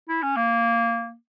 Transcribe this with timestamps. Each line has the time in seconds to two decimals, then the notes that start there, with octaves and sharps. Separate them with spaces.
0.09 E4
0.23 C#4
0.37 A#3